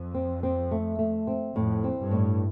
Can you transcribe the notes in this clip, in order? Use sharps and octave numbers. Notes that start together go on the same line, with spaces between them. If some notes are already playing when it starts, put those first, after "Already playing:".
Already playing: F2
C4
C4
A3
A3
C4
F2 A2
C4
G2
A2